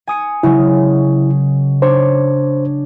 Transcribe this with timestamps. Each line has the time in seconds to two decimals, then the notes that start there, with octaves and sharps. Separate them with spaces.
0.07 G#5 D#6 C#7
0.43 C#3 F#3 G#3 E4
1.82 D4 C5 C#5